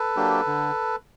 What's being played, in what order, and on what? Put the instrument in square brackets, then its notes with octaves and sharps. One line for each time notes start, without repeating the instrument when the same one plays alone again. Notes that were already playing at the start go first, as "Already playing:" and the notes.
Already playing: [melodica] A4 B4
[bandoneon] F#3 A#3 D4 G4
D3